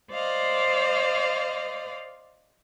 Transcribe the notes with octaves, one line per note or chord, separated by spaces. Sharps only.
C5 D5 D#5 F5